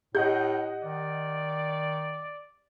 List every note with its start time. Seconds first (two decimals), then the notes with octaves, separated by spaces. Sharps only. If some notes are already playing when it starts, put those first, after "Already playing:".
0.15 A2 G4 D#5 F#5 G6
0.84 D#3 D5